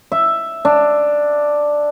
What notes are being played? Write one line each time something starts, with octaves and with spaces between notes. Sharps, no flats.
E5
D4